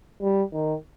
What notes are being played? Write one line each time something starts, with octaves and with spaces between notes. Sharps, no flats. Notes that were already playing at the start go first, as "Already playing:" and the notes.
G3
D#3